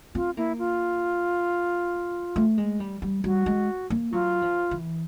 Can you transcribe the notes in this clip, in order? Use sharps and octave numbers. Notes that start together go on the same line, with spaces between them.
C4 F4
A#3 E4
F4
A3
G#3
G3
G3
G3 F#4
G#3
A#3
F#3 F4
F3
E3